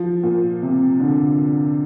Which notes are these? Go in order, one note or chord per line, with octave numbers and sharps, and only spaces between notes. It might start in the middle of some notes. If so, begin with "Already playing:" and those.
Already playing: F3
A#2
C3
D3